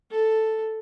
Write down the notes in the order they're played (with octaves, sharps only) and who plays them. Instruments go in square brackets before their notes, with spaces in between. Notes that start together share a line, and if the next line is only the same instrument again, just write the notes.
[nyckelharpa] A4